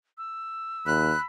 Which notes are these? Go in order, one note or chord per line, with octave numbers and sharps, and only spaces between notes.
E6
D#2 B5 F#6